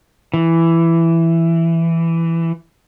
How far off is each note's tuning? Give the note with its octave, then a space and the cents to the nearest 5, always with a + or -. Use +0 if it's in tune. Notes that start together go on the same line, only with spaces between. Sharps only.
E3 +10